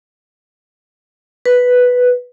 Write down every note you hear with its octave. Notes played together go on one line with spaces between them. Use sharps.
B4